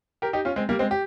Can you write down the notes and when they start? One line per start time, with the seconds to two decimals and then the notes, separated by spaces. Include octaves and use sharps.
0.22 G4 A#4
0.33 D#4 G4
0.45 C#4 F4
0.56 G#3 C4
0.69 G3 A#3
0.79 G#3 C4
0.91 G4